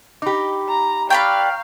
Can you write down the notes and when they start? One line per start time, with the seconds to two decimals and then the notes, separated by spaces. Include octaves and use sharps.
0.22 D#4 G4 B5 D6
0.68 A#5
1.10 B4 D5 F5 G5 A#5 C#6 G6